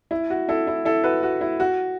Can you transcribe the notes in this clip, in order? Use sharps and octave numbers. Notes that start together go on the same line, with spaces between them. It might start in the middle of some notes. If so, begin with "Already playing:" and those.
E4
F#4
E4 A4
E4
E4 A4
F#4 B4
F#4
E4
F#4